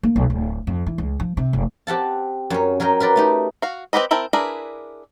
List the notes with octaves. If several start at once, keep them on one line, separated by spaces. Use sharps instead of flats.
A#3
B1
D1
F2
E3
C#2
F3
C3
F1
C4 G4 F#5 A5
F#2 C#4
F#3 A#4 D#5 G5
A#4 B4 D5 G5
A3 D#4 G4
F#4 F5
C4 C#4 G4 B4 D#5
C4 E4 A#4 G5 A5
D4 E4 G#4 A#4 B4